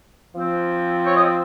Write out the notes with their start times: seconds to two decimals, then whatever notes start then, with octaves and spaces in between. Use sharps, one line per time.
0.35 F3 C4
1.07 C#5
1.16 D#5